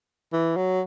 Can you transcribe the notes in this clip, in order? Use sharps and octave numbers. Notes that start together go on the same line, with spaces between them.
E3
F#3